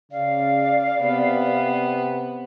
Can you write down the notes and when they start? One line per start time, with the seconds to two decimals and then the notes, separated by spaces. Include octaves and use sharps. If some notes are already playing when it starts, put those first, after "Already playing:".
0.12 C#3 D5 F5
1.01 C3 B3